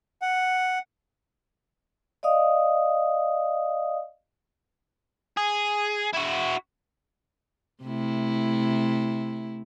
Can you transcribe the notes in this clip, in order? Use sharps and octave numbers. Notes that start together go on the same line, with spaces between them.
F#5
D5 D#5 F5 D#6
G#4
E4 F#4
C3 A3 E4